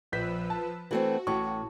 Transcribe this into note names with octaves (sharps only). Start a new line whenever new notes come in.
A#1 F3 B4 E6 G6 B6
A5
E3 A3 C4 F#4
A1 A2 C#5 C#6